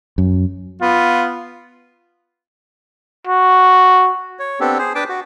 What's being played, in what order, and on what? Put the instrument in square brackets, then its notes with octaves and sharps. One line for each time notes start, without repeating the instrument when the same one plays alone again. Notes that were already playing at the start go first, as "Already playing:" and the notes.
[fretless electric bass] F#2
[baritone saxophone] B3 [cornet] F4
[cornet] F#4
[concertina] C#5
B3 C4 D4 G4 A4
G#4 C5
D4 B4 G5 A5 D6
F#4